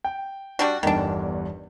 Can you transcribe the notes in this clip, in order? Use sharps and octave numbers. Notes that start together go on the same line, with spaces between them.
G5
G3 D4 F#4
G1 E2 G2 D#3 D4